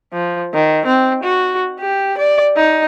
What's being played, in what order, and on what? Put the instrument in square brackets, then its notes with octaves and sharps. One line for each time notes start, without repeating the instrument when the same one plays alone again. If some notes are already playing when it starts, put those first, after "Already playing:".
[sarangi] F3
D#3
C4
F#4
G4
D5
D#4